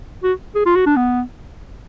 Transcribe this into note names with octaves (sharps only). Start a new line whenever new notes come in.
F#4
G#4
F4
F#4
D4
B3